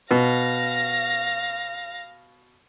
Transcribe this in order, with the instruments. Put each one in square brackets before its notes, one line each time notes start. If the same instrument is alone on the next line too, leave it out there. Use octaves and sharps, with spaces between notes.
[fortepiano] B2 [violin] F5 A#6